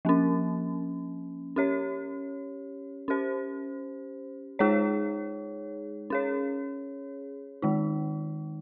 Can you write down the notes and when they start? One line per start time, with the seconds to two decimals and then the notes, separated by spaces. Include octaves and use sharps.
0.05 F3 A#3 C#4
1.56 C#4 G4 C#5
3.08 C#4 G4 C5
4.59 G#3 D#4 G#4 C#5
6.10 C#4 G#4 C#5
7.62 D#3 G#3 D#4